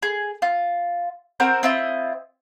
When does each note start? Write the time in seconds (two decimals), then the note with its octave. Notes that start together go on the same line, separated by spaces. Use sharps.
0.03 G#4
0.42 F4
1.40 C4 F#4 A#4 C5
1.63 C4 E4 F4 D#5